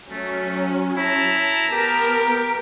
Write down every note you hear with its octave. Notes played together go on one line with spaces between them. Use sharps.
F#3 A3 C#4
E4 A5 A#5
B3 G4 A#4